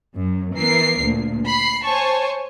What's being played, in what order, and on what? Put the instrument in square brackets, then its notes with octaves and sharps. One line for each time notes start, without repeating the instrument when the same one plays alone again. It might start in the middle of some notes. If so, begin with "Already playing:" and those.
[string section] F#2
E3 B3 A#4 C7
D2 A#2
B5 C7
C5 C#5 G#5 A5 C#6